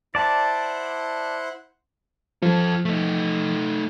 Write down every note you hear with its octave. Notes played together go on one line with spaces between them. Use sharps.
E4 C5 D5 F#5 A5
F3 F4 A4
A3 D#4